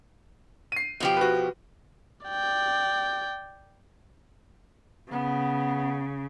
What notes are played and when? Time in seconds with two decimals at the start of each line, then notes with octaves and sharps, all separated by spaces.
0.72 C7 D#7
1.00 B2 F3 G4
1.17 F#4 B4
2.27 D5 G5
5.11 C#3 B3